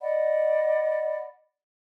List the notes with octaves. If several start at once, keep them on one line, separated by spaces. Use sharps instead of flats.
D5 D#5 F#5 B5